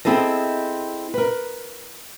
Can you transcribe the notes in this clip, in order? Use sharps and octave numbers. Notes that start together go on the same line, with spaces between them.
C4 E4 G#4 A4 D#5
A#4 B4